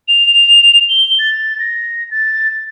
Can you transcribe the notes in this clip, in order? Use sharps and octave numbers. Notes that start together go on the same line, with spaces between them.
F7
G7
A6
A#6
A6